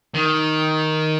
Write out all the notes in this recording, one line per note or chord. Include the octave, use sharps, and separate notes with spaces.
D#3